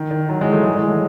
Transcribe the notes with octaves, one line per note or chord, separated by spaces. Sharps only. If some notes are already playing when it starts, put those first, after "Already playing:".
Already playing: D#3
D#3
D#3 F#3
E3 G#3
F#3 A3
E3 G#3
E3 G#3
F#3 A3